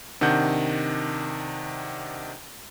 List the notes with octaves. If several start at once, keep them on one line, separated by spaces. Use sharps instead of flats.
C3 D#3 D4 F#5 G6